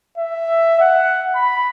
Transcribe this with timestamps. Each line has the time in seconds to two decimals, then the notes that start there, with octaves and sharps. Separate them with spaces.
0.18 E5
0.80 F#5
1.36 B5